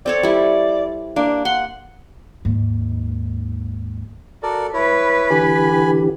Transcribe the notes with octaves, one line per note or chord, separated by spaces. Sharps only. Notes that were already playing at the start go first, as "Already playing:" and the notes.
C4 A4 C#5 D5
G3 E4
A#3 D4
F#5 C6
D#2 G#2
F#4 A4 A#4 D5
E4 B4 C#5
D3 E3 G4 G#5 B5